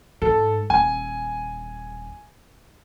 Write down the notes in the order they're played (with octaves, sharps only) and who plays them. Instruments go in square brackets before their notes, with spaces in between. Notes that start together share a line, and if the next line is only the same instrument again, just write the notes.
[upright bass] G#2 [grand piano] A4
[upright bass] D#1 [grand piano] G#5